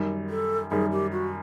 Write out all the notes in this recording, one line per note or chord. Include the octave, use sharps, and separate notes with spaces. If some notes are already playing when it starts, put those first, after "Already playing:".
Already playing: F#2 D#3 G3
A4
F#2 D#3 G3 G#4
G4
F#4